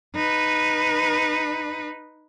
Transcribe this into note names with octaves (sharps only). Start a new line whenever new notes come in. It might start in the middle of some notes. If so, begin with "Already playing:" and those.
D#4 B4